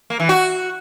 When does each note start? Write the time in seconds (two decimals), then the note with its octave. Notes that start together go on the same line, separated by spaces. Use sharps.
0.10 A#3
0.20 E3
0.29 F#4